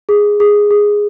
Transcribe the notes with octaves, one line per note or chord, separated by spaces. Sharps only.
G#4
G#4
G#4